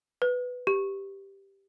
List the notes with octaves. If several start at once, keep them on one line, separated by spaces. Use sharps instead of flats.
B4
G4